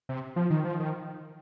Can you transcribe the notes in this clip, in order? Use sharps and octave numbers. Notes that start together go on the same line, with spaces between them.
C3
F3
D#3
F3
D#3